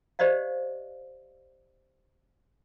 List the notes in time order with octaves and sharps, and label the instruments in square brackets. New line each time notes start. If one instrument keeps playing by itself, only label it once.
[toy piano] G4 C5 D5 D#5 F5